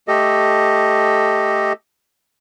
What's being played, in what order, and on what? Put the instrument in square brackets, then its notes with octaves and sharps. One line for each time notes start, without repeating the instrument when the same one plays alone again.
[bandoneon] A3 G4 A4 D#5